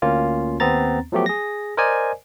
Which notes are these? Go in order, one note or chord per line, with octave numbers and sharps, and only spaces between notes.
D2 A#3 C#4 F4
D#2 B3 C4 A#5 A6
F3 F#3 A3 B3 G4
G#4 A#6
A#4 C5 D5 D#5 G#5